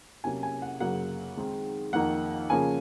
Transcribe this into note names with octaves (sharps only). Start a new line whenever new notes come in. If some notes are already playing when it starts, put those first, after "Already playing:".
C3 F#3 A#3 C#4 G#5
G#5
F#5
F#2 C#3 F#3 A#3 F#5
D#3 G#3 C4 D#4
F2 D#3 A#3 D#4 F#5
C#3 F3 A#3 C#4 G#5